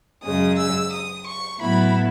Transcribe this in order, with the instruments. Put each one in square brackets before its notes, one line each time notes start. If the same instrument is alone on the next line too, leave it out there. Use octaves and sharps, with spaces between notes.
[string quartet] F#2 C#3 G#3 D#6
E6
D#6
C#6
A2 F#3 B3 E4 B5